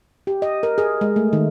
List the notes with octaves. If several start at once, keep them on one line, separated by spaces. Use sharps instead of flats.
G4
D#5
A#4
G#4
G#3
A3
D#3